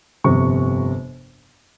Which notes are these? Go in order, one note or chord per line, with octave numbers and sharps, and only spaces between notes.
G1 F2 C3 C#6